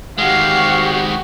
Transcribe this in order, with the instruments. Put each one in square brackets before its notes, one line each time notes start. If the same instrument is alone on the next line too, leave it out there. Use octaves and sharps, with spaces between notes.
[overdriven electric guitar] D#3 G#3 [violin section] F#4 G4 F#5 [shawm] F5